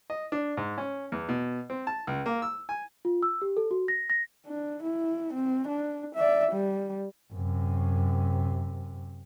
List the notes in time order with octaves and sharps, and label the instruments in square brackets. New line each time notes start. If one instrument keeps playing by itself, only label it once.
[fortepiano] D#5
D4
G#2
C#4
E2
B2
C4
A5
C#2
A#3
E6
G#5
[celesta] F4
E6
G4
A4
F#4
A#6
A#6
[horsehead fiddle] D4
E4
C4
D4
D5 E5
G3
[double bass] F#2 C3